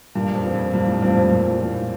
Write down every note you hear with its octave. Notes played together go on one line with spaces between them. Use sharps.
G2 A#2
F2
F3 C4 F4
F2
G2 A#2
A2
G2 F3 C4 F4
F2
G2 A#2
A2
F3 C4 F4
A2